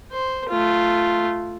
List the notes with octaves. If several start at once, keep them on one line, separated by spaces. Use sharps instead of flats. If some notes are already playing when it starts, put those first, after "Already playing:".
C5
A3 F4